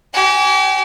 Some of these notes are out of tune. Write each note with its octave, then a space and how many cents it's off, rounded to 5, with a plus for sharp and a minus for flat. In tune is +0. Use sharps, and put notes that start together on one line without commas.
G4 -40 G#5 +0